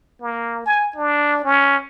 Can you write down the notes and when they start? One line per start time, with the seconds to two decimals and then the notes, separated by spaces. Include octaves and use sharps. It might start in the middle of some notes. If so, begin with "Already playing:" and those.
0.21 A#3
0.66 G#5
0.96 D4
1.44 C#4